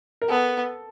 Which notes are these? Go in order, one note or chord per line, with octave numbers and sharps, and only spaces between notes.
A#4
B3 A4